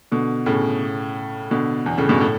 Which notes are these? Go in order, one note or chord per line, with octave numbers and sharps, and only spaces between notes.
B2 D3
A2 C#3
B2 D3
E2
A2 C#3
G2 B2
A2